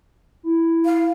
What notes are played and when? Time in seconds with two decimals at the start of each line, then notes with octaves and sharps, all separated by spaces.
0.43 E4
0.85 F5